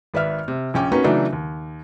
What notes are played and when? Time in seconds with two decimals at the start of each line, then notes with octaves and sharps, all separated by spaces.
0.14 G#1 B4 D5 E5 F6
0.48 C3
0.74 A#1 C#4 G5 D6
0.92 A#3 B3 C#4 D#4 F#4 B4
1.04 C#3 E3 F#3 A3 D4 D#4
1.33 D#2